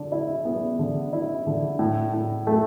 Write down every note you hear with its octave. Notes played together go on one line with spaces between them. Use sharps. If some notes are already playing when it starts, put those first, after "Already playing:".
Already playing: D3
E4
B3
D3
E4
D3
A2
A2
A3